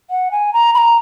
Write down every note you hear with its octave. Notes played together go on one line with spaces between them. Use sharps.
F#5
G#5
A#5
B5
A#5